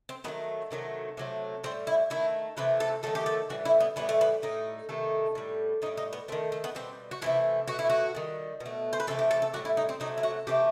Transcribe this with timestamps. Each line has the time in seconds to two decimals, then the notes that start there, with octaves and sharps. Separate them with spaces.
0.09 C4
0.24 D#3 F#3 A3 B3
0.71 C3 D#3 F#3 A3
1.17 C3 F#3 A3
1.64 A2 G3 C4
1.87 E4
2.10 D#3 A3 E4
2.57 C3 E3 A3 B4
2.80 A4
3.03 D#3 F#3 A3 A4
3.15 G4
3.26 A4
3.49 A2 E3 G3 F#4
3.65 E4
3.80 B3
3.96 A2 E3 G3 B3
4.09 A3
4.21 B3
4.42 A2 G3 D#4
4.89 C3 D#3 A3
5.35 A2 G3
5.82 A2 D#4
5.86 G3
5.97 D#4
6.13 B3
6.28 A3 C4
6.32 D#3
6.52 A3
6.64 B3
6.75 B2 G3 C4
7.11 F#4
7.21 C3 E3 A3 E4
7.68 B2 A3 F#4
7.79 E4
7.90 F#4
8.15 D#3 G3
8.60 B2
8.66 A3
8.93 C5
9.00 B4
9.07 C3 E3 A3 A4
9.19 G4
9.31 A4
9.42 A4
9.54 A2 G3 F#4
9.65 E4
9.77 D#4
9.89 C4
10.00 C3 F#3 A3 D#4
10.18 E4
10.23 F#4
10.47 C3 E3 A3 G4